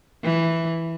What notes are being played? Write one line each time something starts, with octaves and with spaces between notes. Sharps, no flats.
E3